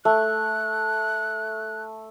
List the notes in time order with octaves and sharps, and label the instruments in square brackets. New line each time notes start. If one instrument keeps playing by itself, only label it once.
[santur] A3 [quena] F#6